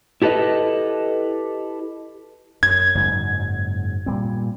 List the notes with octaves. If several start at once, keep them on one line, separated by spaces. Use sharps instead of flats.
E4 G4 A4 B4 D#5
F#2 G#6
F#1 G#2 F#3
A#2 G3 C4